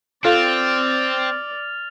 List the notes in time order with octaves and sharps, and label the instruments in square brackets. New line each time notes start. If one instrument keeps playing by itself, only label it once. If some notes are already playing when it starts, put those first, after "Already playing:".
[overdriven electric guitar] C4 [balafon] F4 A4 F5 [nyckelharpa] D5 [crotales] F6 A6 F7